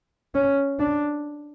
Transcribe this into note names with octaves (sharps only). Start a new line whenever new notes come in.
C#4
D4